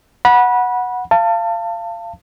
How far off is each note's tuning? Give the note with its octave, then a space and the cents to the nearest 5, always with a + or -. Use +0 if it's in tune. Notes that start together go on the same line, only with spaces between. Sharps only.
F#5 -10 B5 -25
F5 -25 A5 +25